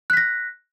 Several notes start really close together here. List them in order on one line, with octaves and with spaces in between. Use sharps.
F#6 B6 A#6